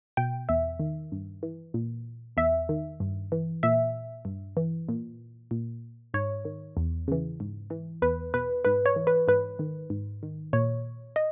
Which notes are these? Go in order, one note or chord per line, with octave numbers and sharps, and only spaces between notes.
B2 G5
E2 E5
D#3
G2
E3
A#2
E2 E5
D#3
G2
E3
A#2 E5
G2
E3
A#2
A#2
G#2 C#5
D#3
E2
C#3 E3
G#2
E3
E2 B4
B2 B4
G#2 B4
C#5
E3
B4
G#2 B4
D#3
G#2
D#3
A#2 C#5
D#5